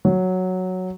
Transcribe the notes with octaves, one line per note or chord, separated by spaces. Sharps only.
F#3